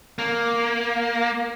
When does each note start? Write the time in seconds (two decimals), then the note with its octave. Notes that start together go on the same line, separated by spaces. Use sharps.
0.19 A#3